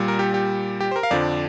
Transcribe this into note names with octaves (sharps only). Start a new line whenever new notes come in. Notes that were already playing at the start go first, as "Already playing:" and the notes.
Already playing: A#2 G3
A#4
G4
G4
G4
C5
A#4
F5
F2 D3 F3 D5